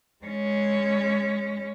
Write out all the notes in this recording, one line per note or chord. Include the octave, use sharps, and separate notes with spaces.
G#3 C#4